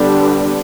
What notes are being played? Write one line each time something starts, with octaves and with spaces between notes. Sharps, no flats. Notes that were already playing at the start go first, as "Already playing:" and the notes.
Already playing: D3 G3 B3 D4